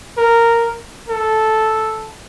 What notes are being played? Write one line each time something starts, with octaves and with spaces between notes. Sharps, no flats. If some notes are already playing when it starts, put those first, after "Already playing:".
A#4
A4